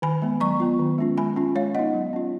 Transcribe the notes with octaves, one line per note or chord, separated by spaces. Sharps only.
D#3 G#5 B5
G#3 B3
F#3 A#5 C#6
B3 F4
D#3
G#3 C#4 F4
G#3 G#5 B5
C#4 F4
G#3 C#5 F5
B3 D#4 D#5 F#5
F#3
C#4 F4